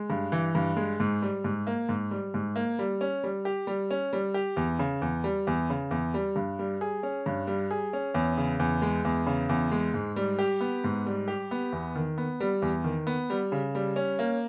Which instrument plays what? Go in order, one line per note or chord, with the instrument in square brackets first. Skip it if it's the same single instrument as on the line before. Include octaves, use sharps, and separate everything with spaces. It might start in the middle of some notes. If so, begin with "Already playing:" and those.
Already playing: [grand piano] G#3
G2
E3
G2
G#3
G#2
G3
G#2
A#3
G#2
G3
G#2
A#3
G3
C#4
G3
G4
G3
C#4
G3
G4
E2
C#3
E2
G3
E2
C#3
E2
G3
G2
G3
G#4
C#4
G2
G3
G#4
C#4
E2
C#3
E2
G#3
E2
C#3
E2
G#3
G#2
G3
G4
B3
G#2
G3
G4
B3
E2
D#3
B3
G3
E2
D#3
B3
G3
C#3
G3
C#4
A#3